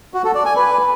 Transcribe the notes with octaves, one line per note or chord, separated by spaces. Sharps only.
F#4
A4
D5
G#5
B4